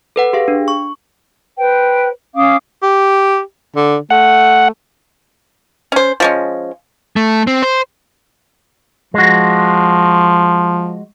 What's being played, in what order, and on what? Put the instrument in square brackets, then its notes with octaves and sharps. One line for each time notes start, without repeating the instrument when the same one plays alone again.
[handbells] A4 B4 F#5
G4 G#4 F5
D4
C#6
[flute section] B4 C5 G5
C#4 F5 D6 D#6
[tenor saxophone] G4
D3
[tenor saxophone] A3 [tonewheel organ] F#5
[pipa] C#4 C5
F3 G#3 C#4
[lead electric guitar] A3
C4
C5
[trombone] F3 [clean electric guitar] G#3 F#4